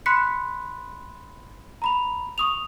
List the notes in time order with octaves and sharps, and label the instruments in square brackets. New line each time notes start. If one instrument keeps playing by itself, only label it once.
[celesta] B5 C6 F#6 B6 C#7
A#5 B5 F7
C#6 D#6 F7